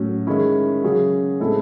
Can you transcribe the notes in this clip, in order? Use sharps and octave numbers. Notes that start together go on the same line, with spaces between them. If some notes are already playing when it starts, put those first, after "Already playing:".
Already playing: A2 F#3 C#4
D#3 G#3 C#4 E4
C#3 F#3 C#4 G#4
A2 G#3 C4 E4 A4